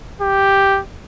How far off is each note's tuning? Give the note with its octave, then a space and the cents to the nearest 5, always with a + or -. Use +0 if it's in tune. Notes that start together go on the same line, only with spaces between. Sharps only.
G4 +0